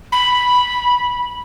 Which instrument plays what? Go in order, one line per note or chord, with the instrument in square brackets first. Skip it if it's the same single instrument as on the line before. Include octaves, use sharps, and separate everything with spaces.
[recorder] B5